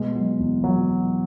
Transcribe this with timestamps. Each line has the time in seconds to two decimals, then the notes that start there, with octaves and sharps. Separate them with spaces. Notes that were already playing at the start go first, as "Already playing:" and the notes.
Already playing: B2 G#3
0.15 F#3
0.39 E2
0.64 F#3